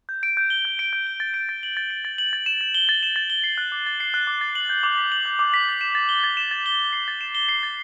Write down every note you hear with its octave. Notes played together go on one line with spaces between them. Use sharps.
G6
D7
G6
G7
G6
D7
G6
G7
A6
D7
A6
F#7
A6
D7
A6
F#7
A6
E7
A6
G7
A6
E7
A6
G7
C7
F#6
D6
A6
C7
F#6
D6
A6
F#7
G6
D6
B6
F#7
G6
D6
B6
A6
E7
A6
G7
A6
E7
A6
G7
G7
C7
A6
E7
G7
C7
A6